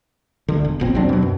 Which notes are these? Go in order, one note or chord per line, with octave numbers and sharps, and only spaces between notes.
D2 D3
E1
A1 A#2 C4
D#2 F#3 C4 D4
B2 F#3
F#2